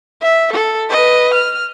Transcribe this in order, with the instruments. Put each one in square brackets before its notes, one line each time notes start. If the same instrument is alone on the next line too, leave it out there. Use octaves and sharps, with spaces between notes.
[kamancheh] E5
A4
B4 D#5
F6